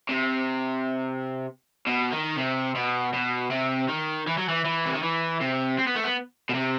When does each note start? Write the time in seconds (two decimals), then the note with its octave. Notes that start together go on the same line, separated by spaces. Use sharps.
0.09 C3
1.87 B2
2.12 D#3
2.37 C3
2.75 B2
3.13 B2
3.51 C3
3.88 D#3
4.27 E3
4.38 F#3
4.49 E3
4.65 E3
4.85 C3
4.94 D#3
5.03 E3
5.41 C3
5.78 C4
5.87 B3
5.96 A3
6.04 B3
6.49 B2
6.54 C3